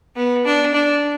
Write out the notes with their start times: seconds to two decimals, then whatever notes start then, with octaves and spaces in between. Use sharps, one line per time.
0.16 B3
0.45 D4
0.74 D4